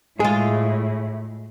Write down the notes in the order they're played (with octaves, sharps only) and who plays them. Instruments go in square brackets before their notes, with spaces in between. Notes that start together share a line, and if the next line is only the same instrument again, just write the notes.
[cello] A2 [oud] G#3 F4 [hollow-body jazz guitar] G#4